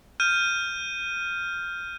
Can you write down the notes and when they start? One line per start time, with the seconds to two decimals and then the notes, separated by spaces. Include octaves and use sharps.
0.20 F6 G6 D#7